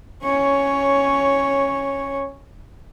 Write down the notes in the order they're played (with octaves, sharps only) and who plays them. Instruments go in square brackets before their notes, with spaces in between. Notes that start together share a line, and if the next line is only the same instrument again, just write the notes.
[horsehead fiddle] C#4 C#5